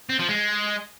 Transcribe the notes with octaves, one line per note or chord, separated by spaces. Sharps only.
C4
F3
G#3